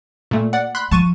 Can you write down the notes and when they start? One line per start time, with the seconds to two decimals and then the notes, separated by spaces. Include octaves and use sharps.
0.31 A#2 A3
0.53 D5 F#5
0.75 B5 C6 F#6
0.91 F3 A5 C#6 D#7